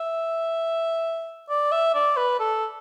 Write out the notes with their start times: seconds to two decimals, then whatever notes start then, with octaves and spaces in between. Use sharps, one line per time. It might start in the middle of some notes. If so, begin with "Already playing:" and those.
Already playing: E5
1.50 D5
1.72 E5
1.95 D5
2.17 B4
2.40 A4